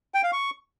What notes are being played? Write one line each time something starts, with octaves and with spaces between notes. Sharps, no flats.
G5
F5
C#6